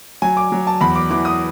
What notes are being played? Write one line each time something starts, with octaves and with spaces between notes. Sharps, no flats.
F#3 G#5
D6
F#3
A5
E2 B5
D6
E3 D6
D#6